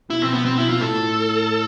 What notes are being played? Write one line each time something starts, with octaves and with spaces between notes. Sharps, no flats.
B2 E4
C4
B3
C4
E4
F4
A2 A4